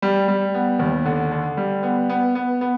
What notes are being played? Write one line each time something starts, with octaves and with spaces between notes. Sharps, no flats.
G3
G3
B3
D#2
D3
D3
G3
B3
B3
B3
B3